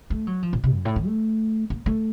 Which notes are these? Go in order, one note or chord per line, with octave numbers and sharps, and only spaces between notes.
A3
F#3
F3
A#2
C3
F#2
A2
D#3
A3
A#3
A3